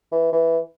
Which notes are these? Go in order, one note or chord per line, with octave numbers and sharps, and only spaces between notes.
E3
E3